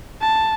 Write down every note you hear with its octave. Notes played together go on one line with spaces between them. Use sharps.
A5